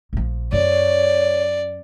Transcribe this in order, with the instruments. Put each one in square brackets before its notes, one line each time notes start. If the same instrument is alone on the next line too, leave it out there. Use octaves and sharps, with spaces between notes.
[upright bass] A#1 F3
[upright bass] F#2 [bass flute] C#5 [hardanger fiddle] D5